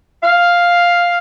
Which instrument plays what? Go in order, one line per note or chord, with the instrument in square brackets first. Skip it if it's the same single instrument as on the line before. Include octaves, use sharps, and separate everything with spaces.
[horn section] F5